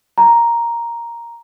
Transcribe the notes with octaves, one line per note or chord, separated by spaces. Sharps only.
A#5